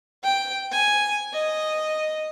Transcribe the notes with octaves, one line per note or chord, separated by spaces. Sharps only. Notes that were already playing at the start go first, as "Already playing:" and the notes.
G5
G#5
D#5